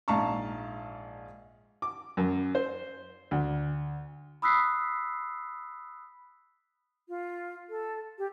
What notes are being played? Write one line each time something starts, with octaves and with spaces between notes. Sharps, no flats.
A#1 G#2 F5 A5 A#5 C#6
D6
F#2
C5
D2
B5 D#6 E6 F#6 B6 C7
F4
A4
G4